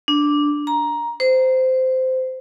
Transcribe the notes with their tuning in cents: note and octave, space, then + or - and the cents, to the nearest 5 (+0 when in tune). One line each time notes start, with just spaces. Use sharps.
D4 -5
A#5 +10
C5 -15